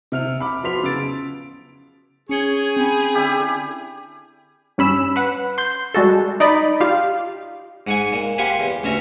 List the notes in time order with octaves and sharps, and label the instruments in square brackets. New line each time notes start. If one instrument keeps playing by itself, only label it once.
[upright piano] C3 F6 F7
B5 D6
F3 F#3 B3 C6 B6 F7
C#3 E6 A6 D7
[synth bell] C#4 C#7 G7 [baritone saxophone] G#4 [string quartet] C#5
[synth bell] C4 C#4 [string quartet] G5 G#5 B5
[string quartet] D3 [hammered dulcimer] E4 G4 G#5
[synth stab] G2 C#4 B5 E6
B4 F#5
C6 G6
G3 G#3 F#4 A4
D#4 D5 D#5 B5
F4 G4 F5
[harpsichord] G#2 F#5 G#5
A#2
F4 G4 C5 F#5 G#5 B5
E2
A1 D2 C#4 E5 A#5